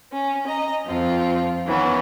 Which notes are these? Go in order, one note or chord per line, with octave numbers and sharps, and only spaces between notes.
C#4
D#5 A#5
F2 F3 C4 F4
D#3 E3 B3 C#4